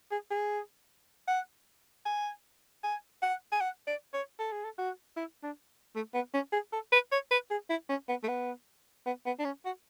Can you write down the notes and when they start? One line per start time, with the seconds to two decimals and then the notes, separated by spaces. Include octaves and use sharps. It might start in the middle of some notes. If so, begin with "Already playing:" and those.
0.11 G#4
0.30 G#4
1.28 F#5
2.06 G#5
2.84 G#5
3.22 F#5
3.52 G#5
3.61 F#5
3.87 D5
4.14 C#5
4.39 A4
4.52 G#4
4.64 A4
4.78 F#4
5.16 E4
5.43 D4
5.95 A3
6.14 B3
6.34 C#4
6.53 G#4
6.73 A4
6.92 B4
7.12 C#5
7.31 B4
7.50 G#4
7.70 E4
7.89 C#4
8.09 B3
8.23 A3
8.28 B3
9.06 B3
9.26 B3
9.39 D4
9.45 C#4
9.65 F#4